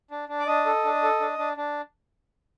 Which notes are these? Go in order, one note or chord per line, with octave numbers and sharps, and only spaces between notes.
D4
D4
D5
D4 D#5
A4
D4
A4
D4
D4
D4